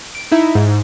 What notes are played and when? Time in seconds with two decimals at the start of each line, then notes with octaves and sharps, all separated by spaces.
0.15 D7
0.32 D#4 E4
0.55 G#2